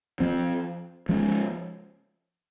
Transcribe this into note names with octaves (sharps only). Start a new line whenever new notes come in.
F3 C4
F3 G#3 C#4